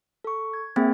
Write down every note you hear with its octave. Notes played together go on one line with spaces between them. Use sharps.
A4 C#6
G#6
A#3 C4 G#4 E5 G5